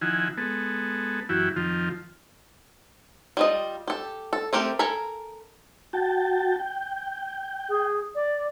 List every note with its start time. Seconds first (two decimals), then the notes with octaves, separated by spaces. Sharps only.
0.01 D#3 F3 E4 F#5 G#5
0.37 G#3 B3 A4
1.29 F#2 E3 E4 F#4 G4
1.56 F2 D#3 F3 F4
3.37 G3 F4 D#5
3.88 G4 A4
4.33 A4
4.53 A3 C4 G4 A#4
4.79 A4 A#4 G#5 A#5 B5
5.93 F#4 G5 A5
6.60 G5
7.69 G#4
8.15 D5